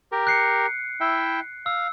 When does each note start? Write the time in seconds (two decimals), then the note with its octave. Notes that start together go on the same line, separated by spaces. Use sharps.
0.12 G4 A#4
0.27 F#6 C7 C#7
1.01 E4 E5 G5
1.66 F5 E6